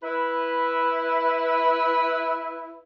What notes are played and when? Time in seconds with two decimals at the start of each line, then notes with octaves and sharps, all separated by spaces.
0.03 E4 B4